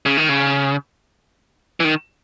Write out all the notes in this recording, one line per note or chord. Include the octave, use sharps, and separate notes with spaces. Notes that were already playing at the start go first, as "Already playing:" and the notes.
C#3
D#3
C#3
E3
D#3